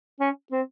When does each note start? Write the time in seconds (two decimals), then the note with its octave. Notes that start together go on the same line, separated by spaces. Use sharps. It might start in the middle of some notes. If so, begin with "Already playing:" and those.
0.20 C#4
0.52 C4